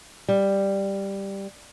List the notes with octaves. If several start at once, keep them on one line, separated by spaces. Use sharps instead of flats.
G3